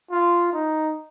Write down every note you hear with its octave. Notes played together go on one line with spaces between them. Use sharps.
F4
D#4